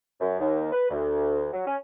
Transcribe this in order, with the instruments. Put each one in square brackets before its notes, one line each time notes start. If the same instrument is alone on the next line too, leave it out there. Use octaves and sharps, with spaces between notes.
[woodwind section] F#2
D#2
B4
D2
F#3
C#4